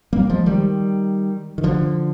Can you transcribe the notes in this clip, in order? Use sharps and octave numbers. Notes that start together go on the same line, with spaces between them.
G3 A#3
F3 G#3
D#3 G3
D#3
D3 F3